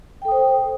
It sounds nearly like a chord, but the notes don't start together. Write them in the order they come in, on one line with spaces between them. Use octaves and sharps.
G5 A4 D#6 C5